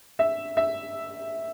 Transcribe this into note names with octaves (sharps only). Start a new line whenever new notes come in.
E5
E5